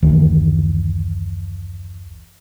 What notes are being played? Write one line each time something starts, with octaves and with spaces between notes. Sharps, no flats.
F#1 D2 D#3 E3